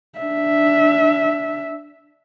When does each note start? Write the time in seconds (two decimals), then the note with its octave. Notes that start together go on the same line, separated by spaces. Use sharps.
0.19 D4 E5